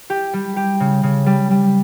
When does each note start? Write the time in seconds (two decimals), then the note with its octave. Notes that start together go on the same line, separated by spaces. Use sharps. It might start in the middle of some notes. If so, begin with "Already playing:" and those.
0.10 G4
0.33 G3
0.56 G4
0.80 C#3
1.03 C#3
1.26 G3
1.51 G3